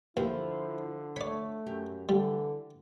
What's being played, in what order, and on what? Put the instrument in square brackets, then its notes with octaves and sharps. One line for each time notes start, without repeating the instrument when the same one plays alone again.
[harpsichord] D#2 [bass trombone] D3 [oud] F3 [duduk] E4
[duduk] A3 [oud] C#5 [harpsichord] D5 B5
[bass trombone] F#2 [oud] G4
[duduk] D3 [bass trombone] E3 [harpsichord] G3